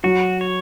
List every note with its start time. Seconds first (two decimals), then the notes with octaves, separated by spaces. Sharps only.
0.04 F#3 F#4
0.41 C#5